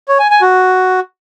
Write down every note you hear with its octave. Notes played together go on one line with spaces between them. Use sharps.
C#5
G#5
G#5
F#4